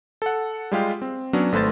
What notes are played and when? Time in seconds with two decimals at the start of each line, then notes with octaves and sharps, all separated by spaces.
0.22 A4 F#5
0.71 G3 G#3 F4 G4
1.02 C4
1.33 F#3 B3 C#4 D4
1.52 G#1 A3 B4 C5 A6